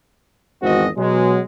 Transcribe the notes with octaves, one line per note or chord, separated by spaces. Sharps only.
G#1 E2 G#3 C4 F#4 D#5
B2 F#3 G#3